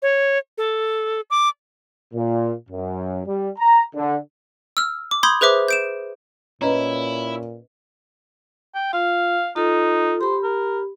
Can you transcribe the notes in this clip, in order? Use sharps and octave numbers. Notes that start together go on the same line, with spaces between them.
C#5
A4
D6
A#2
F#2
G3
A#5
D3
E6 F6
D6
B5 C6 D#6 G6 G#6
G#4 B4 C5 E5 D6
G6 D7 E7
A#2 C#4 E4 B4 D#5 A#5
G5
F4 F5
D#4 F4 A4
G4 C5 B5
A#4